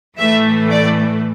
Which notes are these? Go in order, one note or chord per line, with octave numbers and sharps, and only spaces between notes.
A2 E3 A3 E5
D5